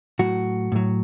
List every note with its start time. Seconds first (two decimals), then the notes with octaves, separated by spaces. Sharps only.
0.19 A2 F#3 F#4
0.72 A2 F#3